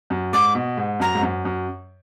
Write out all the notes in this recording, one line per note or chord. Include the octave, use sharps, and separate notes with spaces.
F#2
G#2 D6
B2
G#2
F#2 A#5
G#2
F#2
F#2